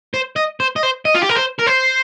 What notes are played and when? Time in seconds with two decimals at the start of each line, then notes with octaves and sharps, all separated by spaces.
0.14 C5
0.36 D#5
0.60 C5
0.76 D#5
0.83 C5
1.05 D#5
1.15 F4
1.22 G4
1.29 A#4
1.36 C5
1.59 A#4
1.67 C5